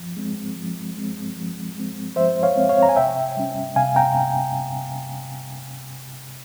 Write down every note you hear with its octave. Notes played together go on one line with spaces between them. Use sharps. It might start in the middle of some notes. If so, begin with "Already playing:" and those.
Already playing: F3
G#3 C4
F3
G#3 C4
F3
G#3 C4
F3 C5 E5
C#5 F5
G#3 C4
C#5 F5
A#5
G#5
C3 E5 G5
G3 C#4
C3 F5 G#5
G5 A#5